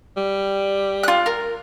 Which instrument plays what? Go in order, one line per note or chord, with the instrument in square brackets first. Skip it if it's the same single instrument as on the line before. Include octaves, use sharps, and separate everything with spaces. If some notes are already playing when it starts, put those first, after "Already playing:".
[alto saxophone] G3
[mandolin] F4 F#6
A#4